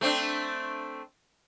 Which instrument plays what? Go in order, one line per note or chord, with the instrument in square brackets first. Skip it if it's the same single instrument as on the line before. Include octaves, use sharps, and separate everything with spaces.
[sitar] A3 C4 D4